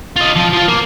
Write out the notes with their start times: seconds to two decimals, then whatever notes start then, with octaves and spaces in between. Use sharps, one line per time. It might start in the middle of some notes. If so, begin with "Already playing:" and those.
0.16 F4 D#5
0.36 F3
0.53 F3 F4
0.69 A#3